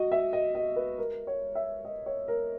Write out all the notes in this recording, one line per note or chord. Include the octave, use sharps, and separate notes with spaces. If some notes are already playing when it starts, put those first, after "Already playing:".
Already playing: F#4 D#5
E5
D#5
D#5
B4
A#4
C#5
E5
D#5
C#5
A#4